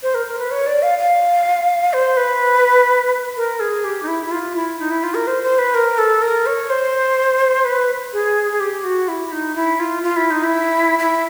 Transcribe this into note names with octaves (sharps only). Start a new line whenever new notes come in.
C5
A#4
A#4
B4
C#5
D5
F5
F5
C5
B4
A#4
G#4
G4
D#4
E4
E4
F4
E4
D#4
E4
F4
A#4
C5
C5
B4
A#4
A4
A#4
C#5
C5
B4
G#4
G#4
G4
F#4
E4
D#4
E4
F4
F4
E4
D#4
E4
E4